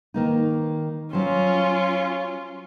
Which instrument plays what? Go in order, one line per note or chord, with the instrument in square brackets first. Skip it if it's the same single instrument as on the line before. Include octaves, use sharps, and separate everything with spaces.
[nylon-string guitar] D#3 A#3 D#4
[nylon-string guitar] F#3 C5 [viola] C#4 F4